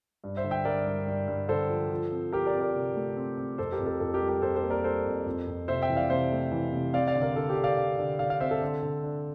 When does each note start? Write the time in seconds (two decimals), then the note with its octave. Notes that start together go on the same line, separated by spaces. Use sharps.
0.24 G2
0.37 C5 E5
0.44 D3
0.51 E5 G5
0.65 G2 A#4 D5
0.86 G2
1.07 G2
1.28 G2
1.48 D3 A4 C5
1.70 F3
1.91 F3
2.12 C4
2.33 F3 G4 A#4
2.47 A#4 D5
2.54 C4
2.60 A#4 D5
2.74 C3
2.96 A3
3.17 C4
3.37 C4
3.58 F2 A4 C5
3.72 G4 A#4
3.79 F2
3.86 A4
4.00 F2 A4
4.14 G4 A#4
4.21 G3
4.29 G4 A#4
4.42 F2 A4 C5
4.56 A4 C5
4.63 A#3
4.70 A#4 D5
4.84 G3 A4 C5
5.06 F2
5.26 F2
5.47 F2
5.68 C3 C5 E5
5.82 E5 G5
5.89 E3
5.96 D5 F5
6.10 C3 C5 E5
6.32 A3
6.52 E3
6.72 C3
6.93 C4 D5 F5
7.07 D5 F5
7.15 D3
7.21 A#4 D5
7.36 D3 A4
7.49 G4
7.57 D3
7.64 D5 F5
7.78 D3
7.99 D3
8.19 D3 D5 F5
8.30 D5 F5
8.40 C4 C5 E5
8.51 A4
8.61 D3
8.82 D3
9.04 D4